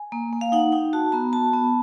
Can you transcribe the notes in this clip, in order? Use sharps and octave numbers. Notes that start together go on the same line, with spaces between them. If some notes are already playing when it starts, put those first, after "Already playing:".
Already playing: G#5
A#3
A#3
F5
D#4 F#5
D#4 G5
F#4 A5
B3 A#5
F#4 A5
B3